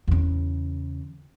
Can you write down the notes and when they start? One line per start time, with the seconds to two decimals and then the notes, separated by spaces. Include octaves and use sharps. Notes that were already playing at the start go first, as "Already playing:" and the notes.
0.08 E2 C#3